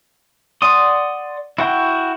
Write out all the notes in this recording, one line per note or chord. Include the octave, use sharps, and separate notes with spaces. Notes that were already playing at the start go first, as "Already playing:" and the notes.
D5 F#5 C6 D#6
E4 F#4 F#5 G5